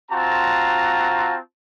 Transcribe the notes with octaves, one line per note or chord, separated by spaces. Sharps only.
C4 F4 F#4 A5 A#5